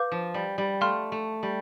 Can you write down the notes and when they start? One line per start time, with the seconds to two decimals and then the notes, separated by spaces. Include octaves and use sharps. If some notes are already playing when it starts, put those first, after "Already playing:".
Already playing: B4 F5 D6 G6
0.11 F3
0.34 G3
0.58 G3
0.81 A3 F5 C6 F6
1.12 A3
1.43 G3